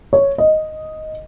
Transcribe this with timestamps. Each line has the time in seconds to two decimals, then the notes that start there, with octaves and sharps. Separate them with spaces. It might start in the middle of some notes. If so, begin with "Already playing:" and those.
0.13 C#5
0.38 D#5